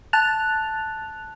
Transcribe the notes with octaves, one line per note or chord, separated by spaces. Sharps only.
A5 F#6 A6 F7